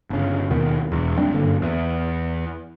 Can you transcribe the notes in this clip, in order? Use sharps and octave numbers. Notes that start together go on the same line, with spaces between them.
G1 C#3
D#2 B2 D#3 B3
E1 E2
A#1 G3 C4 D4
F#1 G2 D3 A#3
E2